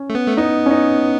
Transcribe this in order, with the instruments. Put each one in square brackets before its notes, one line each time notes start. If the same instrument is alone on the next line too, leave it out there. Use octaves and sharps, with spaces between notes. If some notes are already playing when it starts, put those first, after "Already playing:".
Already playing: [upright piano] C#4
[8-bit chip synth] A3
B3
A3
[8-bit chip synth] B3 [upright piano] D#4
[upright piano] C#4
D#4